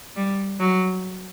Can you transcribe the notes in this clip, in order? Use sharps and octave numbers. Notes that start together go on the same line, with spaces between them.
G3
F#3